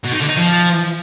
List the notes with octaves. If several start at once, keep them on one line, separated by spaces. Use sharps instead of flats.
B2
D#4
D3
D#4
F3